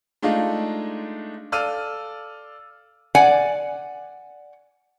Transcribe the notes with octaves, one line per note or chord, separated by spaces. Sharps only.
G#3 A3 D4 D#4 F4 F5
A4 D5 F5 E6 F6 D#7
D5 F#5 G#5